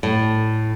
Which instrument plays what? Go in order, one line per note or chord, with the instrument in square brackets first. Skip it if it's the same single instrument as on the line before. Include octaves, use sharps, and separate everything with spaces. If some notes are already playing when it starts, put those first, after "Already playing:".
[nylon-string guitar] A2